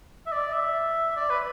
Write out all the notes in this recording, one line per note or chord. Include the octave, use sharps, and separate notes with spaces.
E5
D5
E5
D5
B4